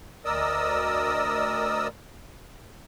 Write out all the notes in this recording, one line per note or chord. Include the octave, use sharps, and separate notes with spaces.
D2 A#4 D5 D#5 D#6 E6